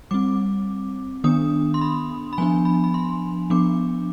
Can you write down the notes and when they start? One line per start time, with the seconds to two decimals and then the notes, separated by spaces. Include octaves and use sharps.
0.11 G3 C4 D6
1.24 D#3 B3 D4 D#6
1.74 C6
1.81 B5
2.33 B5
2.38 F3 B3 D4 G#5
2.65 B5
2.84 B5
2.94 C6
3.50 F3 B3 D4 D6